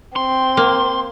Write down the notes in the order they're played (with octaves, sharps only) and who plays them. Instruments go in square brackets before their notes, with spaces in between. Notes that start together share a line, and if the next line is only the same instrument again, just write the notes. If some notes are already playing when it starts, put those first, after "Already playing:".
[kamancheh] C4 [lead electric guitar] C6
[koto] A#3